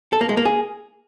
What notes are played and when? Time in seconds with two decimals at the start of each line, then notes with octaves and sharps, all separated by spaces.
0.13 A4
0.21 A#3
0.29 G#3
0.37 A#3
0.45 G#4